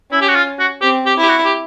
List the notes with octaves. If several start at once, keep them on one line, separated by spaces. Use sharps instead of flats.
C#4 E4
G4
F#4
F4
F#4
C4 G4
G4
E4
G4
F#4
G4